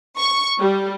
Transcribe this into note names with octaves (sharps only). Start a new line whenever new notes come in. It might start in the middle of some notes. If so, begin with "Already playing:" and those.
C#6
G3